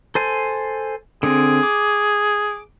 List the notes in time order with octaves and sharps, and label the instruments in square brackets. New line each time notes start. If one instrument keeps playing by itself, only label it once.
[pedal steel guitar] A4 C5 G#5
[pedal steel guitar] D3 C4 [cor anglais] G#4
[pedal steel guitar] D6